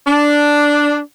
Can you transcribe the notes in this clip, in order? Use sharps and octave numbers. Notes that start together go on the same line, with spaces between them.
D4